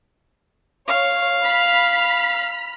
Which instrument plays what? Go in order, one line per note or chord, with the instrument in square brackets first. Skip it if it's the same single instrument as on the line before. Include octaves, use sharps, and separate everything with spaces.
[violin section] C#5 [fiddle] F5
[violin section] B5 F6 B6